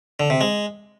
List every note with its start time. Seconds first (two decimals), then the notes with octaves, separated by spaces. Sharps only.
0.20 D3
0.30 C3
0.41 G#3